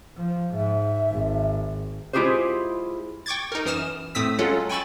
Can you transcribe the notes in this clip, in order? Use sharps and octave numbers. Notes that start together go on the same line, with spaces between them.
F3
G#2 E5
G#1
G#3 E4 F4 G4 G#4 C5
G5 C#6 D6 G#6 A6
D#4 A#4
F#2 E3 D#6 F6 E7
A2 A3 C4 D#6 E6 B6
F#3 G#3 C#4 F4 A4 F#5
G5 G#5 B5 C#6 E6 A6